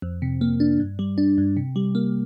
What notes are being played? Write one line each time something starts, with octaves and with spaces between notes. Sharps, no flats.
F2
C3
A#3
D4
G2
G3
D4
G2
C3
G3
A#3